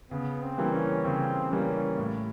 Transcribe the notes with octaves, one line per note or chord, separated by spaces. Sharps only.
C#3 B3
C4
E3 G3 A#3
C#4
C#3 C4
E3 G3 A#3 C#4
A2